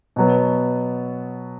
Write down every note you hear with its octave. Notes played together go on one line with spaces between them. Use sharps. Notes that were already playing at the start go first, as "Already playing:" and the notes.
B2 F#3 B3